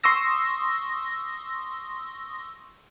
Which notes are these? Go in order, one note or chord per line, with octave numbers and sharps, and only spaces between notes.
C6 C#6 D#6 E6 A#6